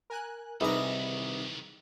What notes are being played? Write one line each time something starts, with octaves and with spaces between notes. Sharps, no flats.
A#4 G#5 F#6
C2 D#3 E3 D#4 G#4 B4 A#5